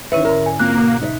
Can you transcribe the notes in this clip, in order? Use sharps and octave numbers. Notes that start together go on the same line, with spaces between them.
D#3 C#4 E4 B4 C#5 E5
G#2 D3 A#4
G#5
A#3 C4 F4 F#6
B2 F#4
D#4 D5 E5